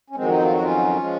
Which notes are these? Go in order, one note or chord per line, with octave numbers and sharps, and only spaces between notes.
C#4
F2 D#3 F#3 G#3 C4
C4 D#4
F4
F#4
C#4 F4
F3 G#3